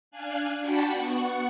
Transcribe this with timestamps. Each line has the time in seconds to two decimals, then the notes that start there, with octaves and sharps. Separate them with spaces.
0.11 D4 F5 G#5 F#6
0.61 D4 F#4 F#5 G5 A5 B5
0.92 B3 F#5 C#6